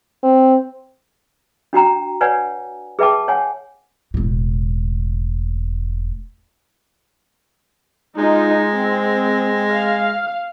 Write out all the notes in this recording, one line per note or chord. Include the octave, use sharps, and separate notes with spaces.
C4
D4 F#4 G5 A#5
B4 C#5 D5 F#5 G#5
G#4 B4 E5 G5 A5 D6
C#5 F#5 G#5
E1 A2
G#3 D#4 F4
C4
F5